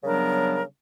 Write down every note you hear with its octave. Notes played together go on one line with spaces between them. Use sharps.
C#3 F#3 G3 B3 D4 A#4